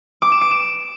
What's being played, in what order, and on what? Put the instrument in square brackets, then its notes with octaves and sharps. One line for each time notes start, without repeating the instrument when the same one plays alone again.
[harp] D6
E7
D7
E7